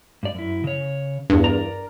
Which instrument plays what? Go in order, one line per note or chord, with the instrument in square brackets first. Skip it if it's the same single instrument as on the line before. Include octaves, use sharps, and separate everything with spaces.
[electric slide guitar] G2 D5
F#2 E4
C#3 C#5
[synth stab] E2 G2
[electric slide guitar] A#4 D5 A#5